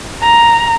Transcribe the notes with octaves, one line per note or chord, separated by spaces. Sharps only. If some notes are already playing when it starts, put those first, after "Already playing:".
A#5